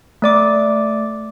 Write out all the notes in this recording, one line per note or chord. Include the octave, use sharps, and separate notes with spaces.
A3 D5 D6